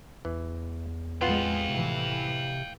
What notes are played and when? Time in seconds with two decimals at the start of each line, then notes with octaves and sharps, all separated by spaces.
0.25 E2 E3
1.21 A1 F2 G#3 B3 F4 F5 G5
1.69 A2 C3 E3